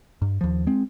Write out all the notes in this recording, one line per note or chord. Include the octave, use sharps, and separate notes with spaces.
G2
D#2 F3
G#3 C4